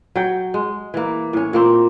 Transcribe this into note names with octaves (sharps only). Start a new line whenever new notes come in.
F#3 G5
G#3
E3 A#3
A2 C#4
A#2 A#3 C4